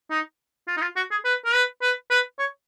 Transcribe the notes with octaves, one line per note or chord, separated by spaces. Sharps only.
D#4
F4
D#4
F4
F#4
G#4
B4
A#4
B4
B4
B4
C#5